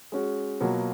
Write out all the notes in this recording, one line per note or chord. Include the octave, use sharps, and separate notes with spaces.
G#3 C#4 F#4
B2 F#3 A#3 F4